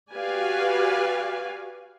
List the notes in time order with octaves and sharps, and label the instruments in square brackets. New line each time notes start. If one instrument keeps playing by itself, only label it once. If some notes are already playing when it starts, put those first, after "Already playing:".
[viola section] F#4 G4 B4 D5 F5 G#5